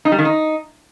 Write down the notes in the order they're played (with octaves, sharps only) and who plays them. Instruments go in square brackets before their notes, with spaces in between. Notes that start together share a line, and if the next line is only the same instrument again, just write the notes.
[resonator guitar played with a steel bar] D#4
G3
D#3
D#4